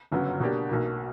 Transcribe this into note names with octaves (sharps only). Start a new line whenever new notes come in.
G1 F#2 C#3 F#3 B3
B2 A#3 D4 G4
B1 B2 A#3